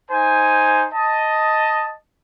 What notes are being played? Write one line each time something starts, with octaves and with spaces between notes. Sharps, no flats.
D#4 C5 G#5
D#5 A5